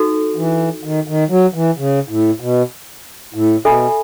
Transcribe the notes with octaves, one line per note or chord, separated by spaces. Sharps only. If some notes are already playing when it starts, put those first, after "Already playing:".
Already playing: D#4 F#4 A4
E3
D#3
D#3
F#3
E3
C#3
A2
B2
A2
B2 A4 E5 G#5 B5